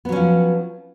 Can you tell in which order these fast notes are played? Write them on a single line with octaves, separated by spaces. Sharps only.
B3 F#3 C#4 F3